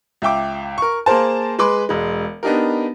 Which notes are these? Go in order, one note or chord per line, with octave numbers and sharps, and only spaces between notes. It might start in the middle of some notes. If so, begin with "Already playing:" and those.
C#2 E5 G5 D6
A#4 C#6
A#3 G#4 A#4 C5 A5
G#3 G#4 B4 B5 C6 D6
E1 G#3
B3 D4 D#4 G4 A#4